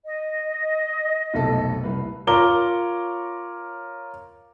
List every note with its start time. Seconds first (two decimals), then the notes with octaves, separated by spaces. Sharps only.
0.05 D#5
1.34 F1 B1 A4
1.84 C2 B4
2.27 F4 A#4 C#5 A#5 D6 G7